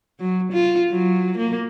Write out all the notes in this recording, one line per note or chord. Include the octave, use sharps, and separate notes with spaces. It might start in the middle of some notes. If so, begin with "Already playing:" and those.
F#3
F4
F#3
A#3